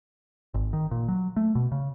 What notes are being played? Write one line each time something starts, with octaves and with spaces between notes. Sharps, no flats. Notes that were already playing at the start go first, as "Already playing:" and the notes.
G#1
D#3
A#2
F#3
A3
B2
C#3